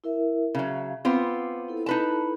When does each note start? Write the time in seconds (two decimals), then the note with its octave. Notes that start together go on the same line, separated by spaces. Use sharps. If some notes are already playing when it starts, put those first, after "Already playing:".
0.04 E4 A#4 E5
0.55 C#3 F#3 E5 F5
1.05 B3 C4 F4 D6
1.68 E4 A4
1.86 D#4 B4 A5